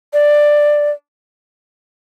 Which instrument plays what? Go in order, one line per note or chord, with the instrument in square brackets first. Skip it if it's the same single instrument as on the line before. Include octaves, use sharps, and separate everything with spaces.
[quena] D5